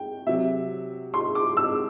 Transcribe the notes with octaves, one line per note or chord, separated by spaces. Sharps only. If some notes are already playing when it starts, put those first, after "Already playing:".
Already playing: G5
C3 F#3 E5
C6
D6
E6